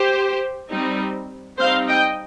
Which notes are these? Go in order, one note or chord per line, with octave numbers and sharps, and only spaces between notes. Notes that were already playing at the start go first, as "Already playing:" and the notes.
Already playing: G4 C5
G3 C4 D#4
G3 C4 D#4 C5 F5
D#5 G5